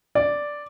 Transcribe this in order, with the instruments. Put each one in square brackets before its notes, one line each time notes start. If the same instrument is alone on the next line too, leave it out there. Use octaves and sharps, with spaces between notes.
[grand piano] D5